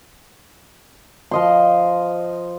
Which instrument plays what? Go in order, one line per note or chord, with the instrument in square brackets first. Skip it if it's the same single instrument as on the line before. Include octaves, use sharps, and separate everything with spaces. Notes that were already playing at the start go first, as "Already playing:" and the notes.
[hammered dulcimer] F3 D#5 C6